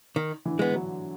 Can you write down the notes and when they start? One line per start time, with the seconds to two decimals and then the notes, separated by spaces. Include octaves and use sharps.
0.16 D#3
0.45 D3 E3
0.59 G#3 B3
0.73 E3 F#3